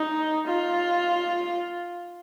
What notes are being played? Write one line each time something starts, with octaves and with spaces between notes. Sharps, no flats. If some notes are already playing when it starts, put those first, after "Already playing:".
Already playing: D#4
F4